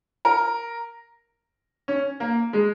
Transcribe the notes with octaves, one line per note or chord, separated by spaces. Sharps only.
A#4
C#4
A#3
G#3